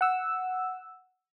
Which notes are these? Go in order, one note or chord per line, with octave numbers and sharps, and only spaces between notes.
F#5 E6